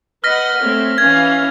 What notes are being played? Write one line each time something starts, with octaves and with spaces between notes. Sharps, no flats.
B4 D#5 F#5 F6 A#6 B6
A3 C4 C#5
E3 C#4 F5 G#6